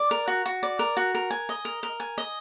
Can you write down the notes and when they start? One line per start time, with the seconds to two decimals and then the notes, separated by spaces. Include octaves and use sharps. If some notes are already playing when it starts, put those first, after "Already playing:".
Already playing: D5
0.11 A#4
0.28 F#4
0.46 F#4
0.63 D5
0.79 A#4
0.97 F#4
1.15 A#4
1.31 G#5
1.49 D#5
1.65 A#4
1.83 A#4
2.00 G#5
2.18 D#5